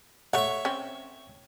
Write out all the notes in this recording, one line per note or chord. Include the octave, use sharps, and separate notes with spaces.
A3 C#5 E5 F#5
C4 C#4